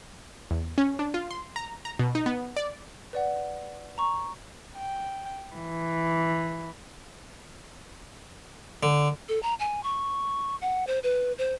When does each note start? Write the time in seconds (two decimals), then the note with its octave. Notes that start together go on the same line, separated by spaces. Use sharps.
0.51 E2
0.78 C#4
0.99 D4
1.14 F4
1.31 C6
1.56 A#5
1.85 A#5
1.99 B2
2.15 D#4
2.26 B3
2.57 D5
3.13 B4 D5 F#5
3.98 A#5 C#6
4.75 G5
5.55 E3
8.83 D3
9.29 A4
9.43 A#5
9.60 G#5
9.83 C#6
10.62 F#5
10.87 C5
11.03 B4
11.38 C5